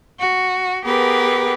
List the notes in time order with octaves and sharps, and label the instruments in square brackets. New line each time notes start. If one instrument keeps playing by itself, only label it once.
[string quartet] F#4
B3 G4 G#4 A#4 B4 F#5